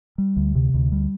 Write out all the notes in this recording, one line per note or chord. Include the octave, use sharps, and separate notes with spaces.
G3
D2
C3
D2
G3